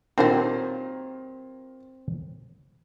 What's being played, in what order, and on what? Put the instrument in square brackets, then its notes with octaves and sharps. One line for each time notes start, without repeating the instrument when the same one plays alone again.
[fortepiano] A#2 D#3 [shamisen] F#3 G3 C5 [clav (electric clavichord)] C4